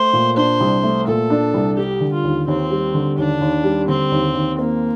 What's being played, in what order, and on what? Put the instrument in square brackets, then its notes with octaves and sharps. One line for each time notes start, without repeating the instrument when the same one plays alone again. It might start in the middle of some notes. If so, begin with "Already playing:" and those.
Already playing: [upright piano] A3 [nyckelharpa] C5
[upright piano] A#2
[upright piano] D4 [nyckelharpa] C5
[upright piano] C2
A3
[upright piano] A#2 [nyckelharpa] A4
[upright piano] D4
C2
[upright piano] G3 [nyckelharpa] G4
[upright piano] D3
[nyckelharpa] F4
[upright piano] D#2
[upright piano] D#2 [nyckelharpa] C4
[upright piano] G3
D3
[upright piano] D#2 [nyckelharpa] D4
[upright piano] D#2
G3
[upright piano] D3 [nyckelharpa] C4
[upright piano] D#2
D#2
[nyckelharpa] A#3 [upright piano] C4